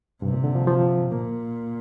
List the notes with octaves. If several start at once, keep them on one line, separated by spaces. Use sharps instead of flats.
G2 C3
A#2
D3
F3
F3
A#2 A#3